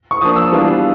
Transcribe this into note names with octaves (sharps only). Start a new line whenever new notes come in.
C#6
F3 A#3 D4 D#6
E6
E3 G3 B3 D4 F4